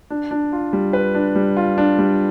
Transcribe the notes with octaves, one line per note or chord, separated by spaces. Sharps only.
D4
D4
F4
G3
B4
D4
G3
F4
D4
G3